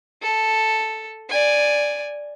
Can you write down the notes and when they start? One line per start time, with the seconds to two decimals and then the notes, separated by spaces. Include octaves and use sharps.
0.22 A4
1.30 D5 G#5